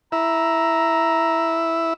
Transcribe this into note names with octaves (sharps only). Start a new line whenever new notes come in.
E4 A#5